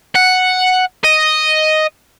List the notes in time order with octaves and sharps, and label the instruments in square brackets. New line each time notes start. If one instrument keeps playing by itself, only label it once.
[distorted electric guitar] F#5
D#5